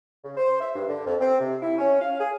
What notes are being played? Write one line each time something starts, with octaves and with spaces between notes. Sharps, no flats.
C#3
C5
E5
G2
D3
F2
C4
C3
E4
C#4
F5
G#4